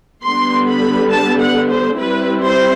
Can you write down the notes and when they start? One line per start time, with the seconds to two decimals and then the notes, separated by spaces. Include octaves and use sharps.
0.24 D3 G3 B3 C6
0.67 B5
1.11 A5
1.40 F#5
1.70 C5
1.98 G3 C4 E4 B4
2.43 C5